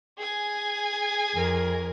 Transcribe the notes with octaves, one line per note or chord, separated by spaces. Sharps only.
G#4 G#5
F2 A#4